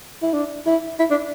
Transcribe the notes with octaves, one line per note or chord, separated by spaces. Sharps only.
E4
D4
E4
E4
D4